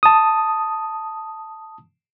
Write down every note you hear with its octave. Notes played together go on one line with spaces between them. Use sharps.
A5 D#6